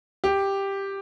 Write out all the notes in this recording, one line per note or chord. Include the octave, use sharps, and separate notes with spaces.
G4